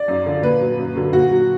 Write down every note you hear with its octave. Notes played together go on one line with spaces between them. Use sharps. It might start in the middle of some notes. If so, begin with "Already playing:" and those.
Already playing: D5
F#2
D3 F3
A#2 B4
F#3
F#2
D3 F#3
A#2 F#4
F#3